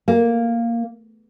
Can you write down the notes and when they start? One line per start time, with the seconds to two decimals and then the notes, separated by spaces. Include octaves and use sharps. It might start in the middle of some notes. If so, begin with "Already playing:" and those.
0.08 A#3